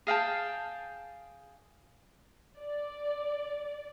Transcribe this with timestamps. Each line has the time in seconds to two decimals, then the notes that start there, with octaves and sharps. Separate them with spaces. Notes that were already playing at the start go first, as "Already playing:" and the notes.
0.07 G#4 F5 G5 A5
2.59 D5